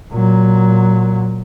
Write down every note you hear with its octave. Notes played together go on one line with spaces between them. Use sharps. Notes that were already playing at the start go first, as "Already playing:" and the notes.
A#2 F#3